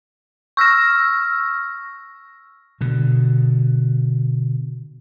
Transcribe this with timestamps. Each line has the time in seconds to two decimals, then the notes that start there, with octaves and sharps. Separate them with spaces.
0.57 C#6 E6 F6 A#6
2.81 B2 D3